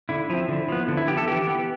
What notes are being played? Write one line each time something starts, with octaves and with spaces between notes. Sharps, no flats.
D3 E4
F3 C4
D3
F3 B3
D3
E4
F3 B3 G4
A4
E3 G4
B3